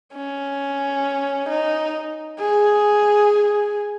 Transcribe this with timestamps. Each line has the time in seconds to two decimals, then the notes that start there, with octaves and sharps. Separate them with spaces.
0.14 C#4
1.49 D#4
2.39 G#4